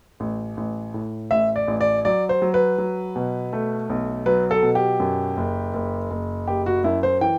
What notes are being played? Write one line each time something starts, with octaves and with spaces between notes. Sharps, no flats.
A1
A1
A2
A1 E5
D5
A1
D5
F#3 D5
C5
F#3
B4
F#3
B2
A3
B1
F#3 B4
A4
B2
G4
F#2
F#1
F#1
F#1
F#1 G4
F#4
F#2 E4
C5
E3 G5